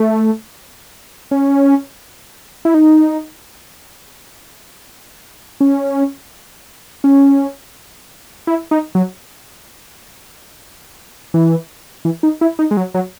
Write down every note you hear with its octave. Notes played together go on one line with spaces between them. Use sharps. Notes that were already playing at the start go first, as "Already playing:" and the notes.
Already playing: A3
C#4
E4
D#4
C#4
C#4
E4
D#4
F#3
E3
E3
D#4
E4
D#4
G#3
F#3
F#3